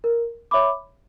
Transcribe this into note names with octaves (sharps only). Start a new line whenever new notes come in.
A#4
C#5 E5 B5 D6